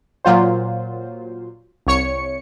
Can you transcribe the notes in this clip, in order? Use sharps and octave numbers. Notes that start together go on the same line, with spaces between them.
A#2 F#3 F4 C5
C2 C#5 C#7